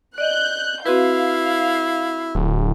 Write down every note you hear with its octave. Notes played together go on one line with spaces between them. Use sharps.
D5 D#5 F#6 G6
C4 E4 F#4 B4 F5
D1